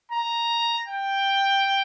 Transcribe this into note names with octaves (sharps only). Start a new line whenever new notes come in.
A#5
G5